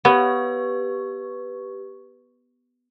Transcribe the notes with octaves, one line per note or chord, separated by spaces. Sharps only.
B3 G4 B4 C#6